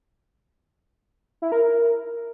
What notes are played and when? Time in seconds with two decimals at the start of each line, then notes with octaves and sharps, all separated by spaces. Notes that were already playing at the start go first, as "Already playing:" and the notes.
1.42 E4
1.52 A#4
1.62 A#4